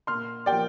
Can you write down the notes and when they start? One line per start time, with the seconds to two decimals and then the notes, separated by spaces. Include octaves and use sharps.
0.07 A#2 C6 F6
0.46 F3 A#3 G4 D5 G5